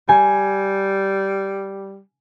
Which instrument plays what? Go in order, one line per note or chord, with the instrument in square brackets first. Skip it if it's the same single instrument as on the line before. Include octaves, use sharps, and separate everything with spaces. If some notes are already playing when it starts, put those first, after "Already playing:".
[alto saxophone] G3 [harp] G#5